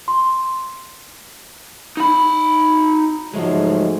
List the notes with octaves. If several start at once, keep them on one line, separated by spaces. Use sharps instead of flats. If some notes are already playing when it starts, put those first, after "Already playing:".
C6
D#4 B5
G#2 F3 F#3 G#3 A3